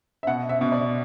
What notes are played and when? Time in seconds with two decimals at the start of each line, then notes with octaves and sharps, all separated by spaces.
0.23 E5
0.27 B2 F#5
0.49 E5
0.61 B2
0.72 D5